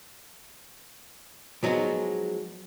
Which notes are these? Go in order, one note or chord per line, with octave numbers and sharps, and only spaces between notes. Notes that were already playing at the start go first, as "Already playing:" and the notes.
F3 F#3 G#3 B3 D#4